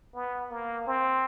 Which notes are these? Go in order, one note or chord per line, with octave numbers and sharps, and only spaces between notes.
B3
A#3
C4